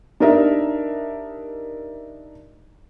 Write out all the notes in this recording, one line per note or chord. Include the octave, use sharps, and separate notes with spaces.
D4 D#4 G4 A#4 D#5 E5